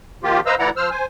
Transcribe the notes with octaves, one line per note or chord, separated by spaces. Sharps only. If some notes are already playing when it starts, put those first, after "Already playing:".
D#3 F3 A#3 F4 G4
B4 C5 D#5 F5 A#5 E6
D2 E3 E4 D5 F#5 A#5
F3 C5 E6 F6
C5 G#5